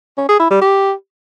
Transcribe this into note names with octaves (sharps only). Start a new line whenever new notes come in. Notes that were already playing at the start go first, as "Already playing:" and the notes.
C#4
G#4
E4
G3
G4